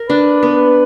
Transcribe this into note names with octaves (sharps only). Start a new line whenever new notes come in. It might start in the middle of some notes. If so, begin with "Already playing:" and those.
Already playing: A#4
D4 B4
B3